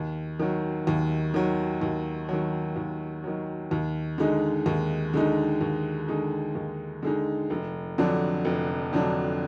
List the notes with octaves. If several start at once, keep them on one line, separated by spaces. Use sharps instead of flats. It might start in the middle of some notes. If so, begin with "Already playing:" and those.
Already playing: D#2
D#3 F#3
D#2
D#3 F#3
D#2
D#3 F#3
D#2
D#3 F#3
D#2
D3 G#3 D#4
D#2
D3 G#3 D#4
D#2
D3 G#3 D#4
D#2
D3 G#3 D#4
F1
F2 D3 F#3 D4
F1
F2 D3 F#3 D4